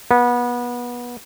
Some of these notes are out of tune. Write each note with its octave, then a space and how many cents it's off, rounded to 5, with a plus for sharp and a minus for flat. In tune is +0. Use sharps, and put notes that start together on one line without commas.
B3 -25